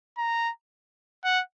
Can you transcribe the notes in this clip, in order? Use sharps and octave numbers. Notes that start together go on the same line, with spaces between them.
A#5
F#5